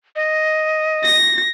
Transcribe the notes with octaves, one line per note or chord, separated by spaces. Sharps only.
D#5
A#6